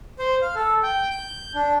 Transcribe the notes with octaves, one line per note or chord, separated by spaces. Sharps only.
C5
F5
A4
G5
G6
D4